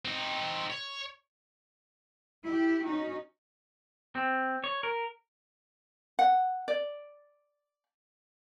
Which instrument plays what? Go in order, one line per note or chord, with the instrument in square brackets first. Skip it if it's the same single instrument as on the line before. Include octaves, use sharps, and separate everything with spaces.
[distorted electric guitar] C4 D#4
C#5
[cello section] E4 G4
C#4 D#4 F#4
[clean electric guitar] C4
C#5
A#4
[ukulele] F#5
D5